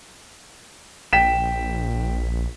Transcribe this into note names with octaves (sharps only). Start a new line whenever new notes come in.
A#1 G5 B6 E7